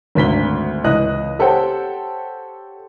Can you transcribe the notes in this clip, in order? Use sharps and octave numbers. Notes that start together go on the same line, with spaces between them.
G#1 D2 B6 G7
C#2 E3 D#5 F#6
G4 A4 C5 C#5 F#5 G5